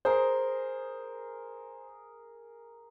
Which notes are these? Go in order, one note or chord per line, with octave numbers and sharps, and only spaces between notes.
G#4 A#4 C5